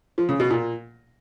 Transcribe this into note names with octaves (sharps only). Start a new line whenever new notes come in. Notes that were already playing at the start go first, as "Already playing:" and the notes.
F3
C#3
B2
A#2